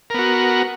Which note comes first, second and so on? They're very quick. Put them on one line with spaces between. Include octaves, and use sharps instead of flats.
A#4 B3 F#4